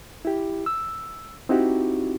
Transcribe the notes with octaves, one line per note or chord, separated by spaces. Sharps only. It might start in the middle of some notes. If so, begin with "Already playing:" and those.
E4 G4
E6
C4 D#4 E4 F#4 G4